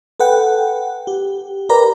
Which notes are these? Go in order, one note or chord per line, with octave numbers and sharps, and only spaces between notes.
A4 B4 F#5 G5
G4
G4 A#4 B4 D5 A#5